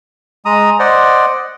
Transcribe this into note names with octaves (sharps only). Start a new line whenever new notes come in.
G#3 A#5 D#6
C5 D5 D#5 F#5